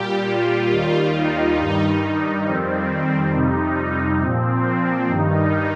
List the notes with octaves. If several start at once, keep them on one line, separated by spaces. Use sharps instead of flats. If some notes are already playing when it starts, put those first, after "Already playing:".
Already playing: A#2 G3 G4
F4
D#2 D#3 G3
D#4
G2 D#3 G3
F2 D#3 G3 C4
F2 C3 G3 D#4
A#2 F3 C4
C4
G2 D#3 G3 D#4